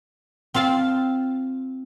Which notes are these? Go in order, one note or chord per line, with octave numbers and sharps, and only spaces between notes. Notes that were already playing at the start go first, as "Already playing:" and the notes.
C4 F4 F5 A5